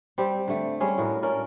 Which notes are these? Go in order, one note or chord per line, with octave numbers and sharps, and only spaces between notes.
G3 C4 G4
D3 A3
G3 G#3 C#4 G#4
A2 F#4 A#4
C#4 D4 A#4 D5